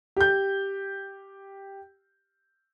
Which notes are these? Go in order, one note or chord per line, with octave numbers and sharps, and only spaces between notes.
G4 G6